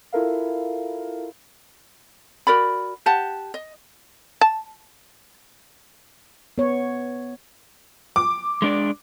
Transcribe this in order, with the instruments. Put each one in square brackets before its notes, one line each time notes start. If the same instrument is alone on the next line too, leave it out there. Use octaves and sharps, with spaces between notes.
[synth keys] E4 F4 A4 A#4 E5 F5
[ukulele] F#4 A#4 D5 B5
G4 F#5 A5
D#5
[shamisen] A5
[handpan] B3 C#5
[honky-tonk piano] D6
[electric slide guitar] G#3 D4 D5